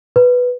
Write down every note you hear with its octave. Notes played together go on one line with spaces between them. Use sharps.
B4